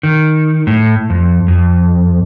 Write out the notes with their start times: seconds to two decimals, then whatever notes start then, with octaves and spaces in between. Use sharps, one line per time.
0.03 D#3
0.67 A2
1.10 F2
1.48 F2